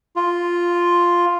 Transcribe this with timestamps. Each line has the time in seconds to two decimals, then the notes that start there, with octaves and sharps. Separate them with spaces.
0.16 F4